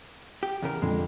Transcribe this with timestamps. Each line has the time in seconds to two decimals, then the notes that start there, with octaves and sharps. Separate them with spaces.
0.43 G4
0.62 E2 C#3 A#4
0.82 F2 D3 G#3